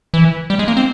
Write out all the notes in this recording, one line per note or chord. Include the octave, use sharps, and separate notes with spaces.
E3
G3
G#3
A#3
C4